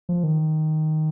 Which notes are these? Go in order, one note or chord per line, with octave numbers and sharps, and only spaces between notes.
F3
D#3